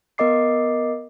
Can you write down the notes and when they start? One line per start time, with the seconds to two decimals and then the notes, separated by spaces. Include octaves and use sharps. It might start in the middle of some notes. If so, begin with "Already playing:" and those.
0.18 B3 A#4 D#5 D6 C7